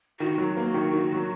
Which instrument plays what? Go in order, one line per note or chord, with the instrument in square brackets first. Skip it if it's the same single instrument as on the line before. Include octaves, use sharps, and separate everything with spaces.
[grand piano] D#3 [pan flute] F#4
[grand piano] F#3
A#3
D#3
D#3
F#3